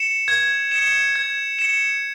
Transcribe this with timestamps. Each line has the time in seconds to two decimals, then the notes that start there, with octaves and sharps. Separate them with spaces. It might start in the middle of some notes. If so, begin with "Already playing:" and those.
Already playing: C#7 E7
0.28 G#6
0.71 C#7 E7
1.16 G#6
1.59 C#7 E7